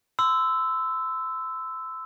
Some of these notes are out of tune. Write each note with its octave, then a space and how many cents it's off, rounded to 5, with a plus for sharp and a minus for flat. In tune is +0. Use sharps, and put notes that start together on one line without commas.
C6 -30 E6 +0